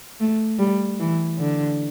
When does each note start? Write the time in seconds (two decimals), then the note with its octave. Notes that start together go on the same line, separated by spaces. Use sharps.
0.20 A3
0.59 G3
1.00 E3
1.38 D3